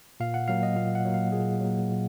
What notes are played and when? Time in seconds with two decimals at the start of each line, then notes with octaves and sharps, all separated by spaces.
0.20 A#2 F5
0.34 F#5
0.48 F#3 A#3 F5
0.63 D#5
0.76 A#2 F5
0.95 F#5
1.05 F#3 A#3
1.14 F5
1.32 A#2 G#4
1.61 F#3 A#3
1.90 A#2